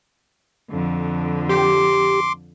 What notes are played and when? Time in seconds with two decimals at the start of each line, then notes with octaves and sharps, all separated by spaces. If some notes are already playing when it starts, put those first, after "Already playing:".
0.71 F2 D3
1.49 G4 C6 D6